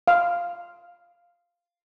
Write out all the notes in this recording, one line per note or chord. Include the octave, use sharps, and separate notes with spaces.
F5